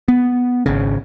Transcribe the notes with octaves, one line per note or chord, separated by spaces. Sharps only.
B3
G#1 C#3